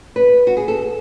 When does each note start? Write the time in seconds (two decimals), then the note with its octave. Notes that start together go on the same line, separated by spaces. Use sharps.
0.16 B4
0.47 F#4
0.57 G#4
0.68 A4